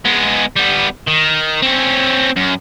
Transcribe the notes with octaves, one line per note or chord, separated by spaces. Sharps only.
G#3 B3
G3 B3
D#3
C4 C#4
F#2